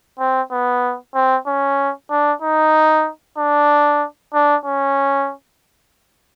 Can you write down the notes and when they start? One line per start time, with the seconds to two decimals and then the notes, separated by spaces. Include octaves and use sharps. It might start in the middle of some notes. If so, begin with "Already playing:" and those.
0.19 C4
0.51 B3
1.15 C4
1.47 C#4
2.11 D4
2.42 D#4
3.38 D4
4.34 D4
4.66 C#4